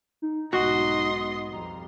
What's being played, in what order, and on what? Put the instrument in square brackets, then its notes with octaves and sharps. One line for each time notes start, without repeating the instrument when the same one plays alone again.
[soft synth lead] D#4
[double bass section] B1 G#2 B3 [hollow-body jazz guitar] F#4 [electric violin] D#5 C6
[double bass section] F2 G3 [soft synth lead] A#5